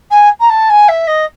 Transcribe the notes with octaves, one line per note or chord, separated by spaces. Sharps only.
G#5
A#5
A5
G#5
E5
D#5